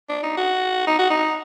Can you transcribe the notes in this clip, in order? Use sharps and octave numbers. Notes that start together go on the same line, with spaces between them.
D4
D#4
F#4
D#4
F#4
D#4